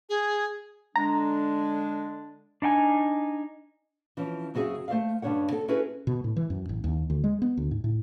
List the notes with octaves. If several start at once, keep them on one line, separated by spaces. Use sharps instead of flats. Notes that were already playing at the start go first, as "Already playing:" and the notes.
G#4
D3 G#3 D4 A#5
D4 D#4 G5 G#5
E3 F3 C4 C#4
F#2 C#3 C4 F#4 G#4 E5
A3 C5 D5 E5 F5
G2 C#3 G3 D4 C#5 F#5
C4 A4
C#4 E4 F#4 G#4 A4 B4
B2
A2
E3
F#2
A1
D#2
D2
G#3
B3
D2
G#2
A2